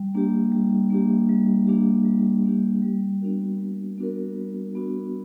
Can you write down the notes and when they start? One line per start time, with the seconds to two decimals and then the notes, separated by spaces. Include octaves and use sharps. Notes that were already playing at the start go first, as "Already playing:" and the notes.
Already playing: G3
0.15 A#3 D4 G4
0.52 G3
0.90 A#3 D4 G4
1.29 G3
1.67 A#3 D4 G4
2.05 G3
2.45 A#3 D4 G4
2.82 G3
3.21 B3 D4 F#4 A#4
3.60 G3
3.98 B3 D4 F#4 A#4
4.36 G3
4.75 B3 D4 F#4 A#4